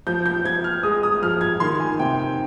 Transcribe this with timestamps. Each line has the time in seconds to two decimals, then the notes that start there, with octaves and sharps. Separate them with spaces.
0.07 F3 G6
0.26 G6
0.45 F3 G#6
0.64 F6
0.83 G#3 D#6
1.03 D#6
1.22 F3 F6
1.41 G#6
1.60 D#3 C6
1.80 G#5
1.99 C3 G5
2.19 G5